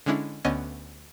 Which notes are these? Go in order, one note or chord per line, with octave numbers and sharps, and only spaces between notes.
D3 G#3 C#4 D4 E4
D2 D3 B3 C#4 D#5